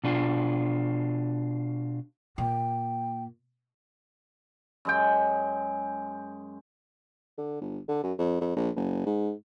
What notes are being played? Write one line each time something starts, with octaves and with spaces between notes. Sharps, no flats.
B2 D4 F4
A#2 G5
F#2 G#3 G5
D3
G1
D3
F#2
F2
F2
A#1
F#1
G#2